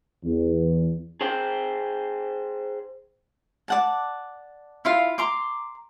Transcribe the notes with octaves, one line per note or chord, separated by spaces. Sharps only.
E2
G#4 C5 G5
D5 F#5 A5
E4 F4 F5
A#5 C6 D6